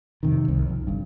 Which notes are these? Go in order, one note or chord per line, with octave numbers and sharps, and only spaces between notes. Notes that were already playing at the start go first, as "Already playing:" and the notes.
F2 C3 D#3
C2
F2
G1 G2